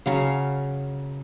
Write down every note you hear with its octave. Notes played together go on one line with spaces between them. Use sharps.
C#3 F#3 F5